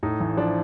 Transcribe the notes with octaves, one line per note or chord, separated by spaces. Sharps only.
A2 D#4
A1
F3 D4